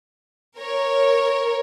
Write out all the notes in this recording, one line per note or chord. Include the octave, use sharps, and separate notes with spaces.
A#4 C#5